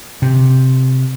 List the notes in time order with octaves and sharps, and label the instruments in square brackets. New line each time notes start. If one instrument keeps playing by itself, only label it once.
[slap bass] C3